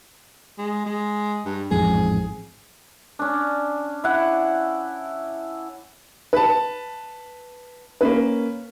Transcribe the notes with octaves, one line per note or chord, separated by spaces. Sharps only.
G#3
G#3
G2
A1 F2 G#2 G#4
C#4 D4
E4 F#5
B4 A5
A#3 C#4 B4